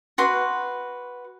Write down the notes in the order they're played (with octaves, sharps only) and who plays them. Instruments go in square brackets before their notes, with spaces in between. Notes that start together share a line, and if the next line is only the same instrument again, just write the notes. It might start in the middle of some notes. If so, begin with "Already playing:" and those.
[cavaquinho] F#4 B4 C6